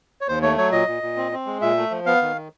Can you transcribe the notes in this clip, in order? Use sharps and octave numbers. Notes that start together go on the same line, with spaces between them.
C#5
D#2 C5
A3 C#5
F#3 C#5
A#2 D#5
A#2
A#2
C4
C4
G#3
A#2 E5
A3
F3
B3 F5
D#3